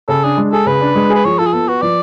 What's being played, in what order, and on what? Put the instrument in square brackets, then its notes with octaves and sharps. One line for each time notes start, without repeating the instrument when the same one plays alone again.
[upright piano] C#3 [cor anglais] A4
[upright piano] D4 [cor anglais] G#4
[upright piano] G#3
[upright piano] G#4 [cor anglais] A4
[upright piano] C#3 [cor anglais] B4
[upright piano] D4
G#3
[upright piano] G#4 [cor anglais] B4
[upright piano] F3 [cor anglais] C#5
[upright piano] F4 [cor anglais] A4
[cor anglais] G#4
[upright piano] B3 [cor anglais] A4
[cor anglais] F#4 [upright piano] B4
[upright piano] F3 [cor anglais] D5